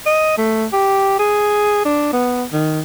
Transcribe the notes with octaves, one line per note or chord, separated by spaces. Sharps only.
D#5
A3
G4
G#4
D4
B3
D#3